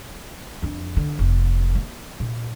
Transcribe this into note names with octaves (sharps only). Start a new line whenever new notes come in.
F2 D4
D3
F1
A#3
A#2